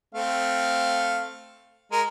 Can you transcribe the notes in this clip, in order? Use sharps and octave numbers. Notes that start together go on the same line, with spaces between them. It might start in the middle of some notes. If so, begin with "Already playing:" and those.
A3 C4 F5
G#3 A#4